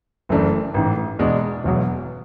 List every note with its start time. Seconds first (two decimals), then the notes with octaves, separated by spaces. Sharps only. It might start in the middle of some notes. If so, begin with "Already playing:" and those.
0.29 F#1 F#2 E3 A3 D4
0.74 A1 G#2 E3
1.19 E2 B2 G#3 D4
1.64 E1 E2 B2 F#3